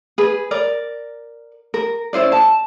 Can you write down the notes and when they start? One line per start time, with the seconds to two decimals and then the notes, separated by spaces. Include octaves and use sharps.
0.18 G#4 B4
0.51 A#4 D5
1.74 A#4
2.13 C#4 E4 C5 D5
2.32 A5